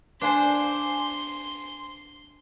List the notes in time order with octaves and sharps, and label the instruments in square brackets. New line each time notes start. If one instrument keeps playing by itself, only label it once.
[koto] D4 C5 [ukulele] B4 F5 G#5 [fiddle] C6